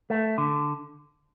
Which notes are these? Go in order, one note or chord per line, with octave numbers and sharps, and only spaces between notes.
A3
D3